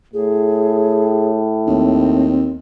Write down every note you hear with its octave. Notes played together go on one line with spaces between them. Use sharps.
A2 G#4
D#2 C4